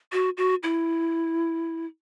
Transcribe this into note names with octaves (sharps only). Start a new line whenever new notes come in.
F#4
F#4
E4